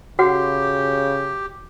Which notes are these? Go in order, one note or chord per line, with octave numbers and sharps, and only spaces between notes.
C#3 F#4 G4 F#5